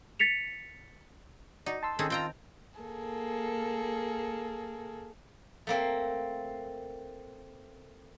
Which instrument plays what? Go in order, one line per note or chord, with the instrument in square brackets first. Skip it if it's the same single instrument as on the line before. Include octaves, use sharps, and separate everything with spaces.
[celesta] A6 B6 C#7 F7
[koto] D#4 [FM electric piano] F#4 D5
[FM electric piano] A5 C6 E6
[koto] D#3 C4 C#4 [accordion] G#4 A4
[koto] C4 G5 A#5 [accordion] F4
[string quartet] A#3 G#4 A4
[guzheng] A3 A#3 C4